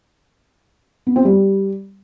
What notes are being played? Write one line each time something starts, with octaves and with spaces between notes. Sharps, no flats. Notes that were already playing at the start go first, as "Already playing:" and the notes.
B3
C4
G3